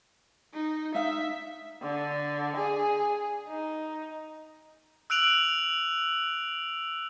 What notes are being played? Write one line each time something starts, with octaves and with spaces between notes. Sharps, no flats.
D#4
D#4 E5 F5
D3
G#4
D#4
E6 F#6 D7 F7 F#7